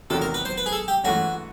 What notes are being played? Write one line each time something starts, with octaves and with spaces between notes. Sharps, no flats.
E2 C3 D#3 F#3 A4
A#4
B4
C5
B4
G#4
A4
G4
G#2 E3 A3 C#4 F#4